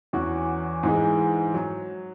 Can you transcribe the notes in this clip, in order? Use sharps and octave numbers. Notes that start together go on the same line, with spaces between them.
E2 E3 C#4 F#4
G#2 E3 G#3
F#3